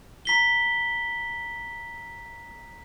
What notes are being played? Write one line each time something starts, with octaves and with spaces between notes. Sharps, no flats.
A#5 B6 G7